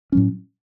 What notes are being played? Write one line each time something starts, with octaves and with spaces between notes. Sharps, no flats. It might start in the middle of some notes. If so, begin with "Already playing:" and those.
A2 F#3 C#4